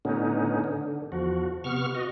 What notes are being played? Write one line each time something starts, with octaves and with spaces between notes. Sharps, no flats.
A2 D3 B3 C#4 D#4
D3
E2 F3 F#4
C3 B3 C#6 F6
F#4 D#5